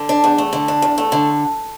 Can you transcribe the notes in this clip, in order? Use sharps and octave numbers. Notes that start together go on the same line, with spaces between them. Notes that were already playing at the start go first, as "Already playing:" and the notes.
Already playing: D3
D4
E2
A3
D3
D4
E2
A3
D3